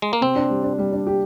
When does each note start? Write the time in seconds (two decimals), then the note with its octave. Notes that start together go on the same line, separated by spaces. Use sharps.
0.02 G#3
0.13 A#3
0.21 C3 C4
0.36 D4
0.50 G3
0.63 D4
0.78 G3
0.92 D4
1.07 G4